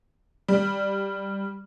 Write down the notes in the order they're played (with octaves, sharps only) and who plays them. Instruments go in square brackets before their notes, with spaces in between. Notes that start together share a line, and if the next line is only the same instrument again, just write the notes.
[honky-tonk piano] G3